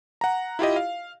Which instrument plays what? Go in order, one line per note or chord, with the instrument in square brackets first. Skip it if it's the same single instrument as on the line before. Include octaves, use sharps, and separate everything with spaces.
[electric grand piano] F#5 A#5
E4 F4 G4 D#5
F5